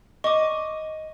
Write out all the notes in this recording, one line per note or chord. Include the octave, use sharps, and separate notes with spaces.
D#5 C#6 D6